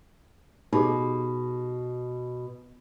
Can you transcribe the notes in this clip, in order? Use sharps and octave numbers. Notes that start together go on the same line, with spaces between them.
B2 D#4 G4 G#4